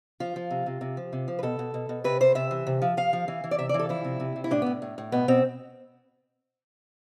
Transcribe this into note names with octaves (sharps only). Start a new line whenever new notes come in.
F3 F4
F3
C3
C3
C3
F3
C3
F3
B4
B2 A4
B2
B2
B2
C3 B4
C3 C5
C3 E5
E3
C3
F3
F3 F5
F3
E3
E3
D5
C3 E5
D5
E3
A4
F3 E4
C3
C3
C3
E4
A2 D4
B3
A2
A2
A2
B2 B3
B2 C4